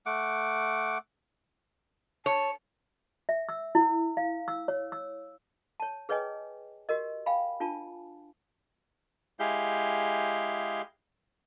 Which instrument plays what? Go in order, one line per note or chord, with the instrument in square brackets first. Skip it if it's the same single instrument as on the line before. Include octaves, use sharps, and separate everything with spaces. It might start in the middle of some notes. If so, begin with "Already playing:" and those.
[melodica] A3 F#5 D6
[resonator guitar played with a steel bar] C#5 [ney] A5
[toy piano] E5
E6
E4
F5
E6
C#5
E6
C#5 A5
G#4 B4 C#5 D#5 G5 G#5
F#4 G4 A#4 D#5
F5 G5 G#5 B5
D4 F4 G#5 A5
[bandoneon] G#3 E4 G4 G#4 F5 G6